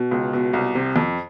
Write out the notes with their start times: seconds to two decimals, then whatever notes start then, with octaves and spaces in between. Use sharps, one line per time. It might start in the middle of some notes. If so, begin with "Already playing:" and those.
Already playing: B2
0.11 C#2
0.33 B2
0.53 C2
0.75 C3
0.96 F2